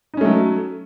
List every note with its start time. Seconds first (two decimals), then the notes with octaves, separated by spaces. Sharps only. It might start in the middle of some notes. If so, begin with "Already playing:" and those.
0.14 D#4
0.17 C#4
0.21 A3
0.25 F#3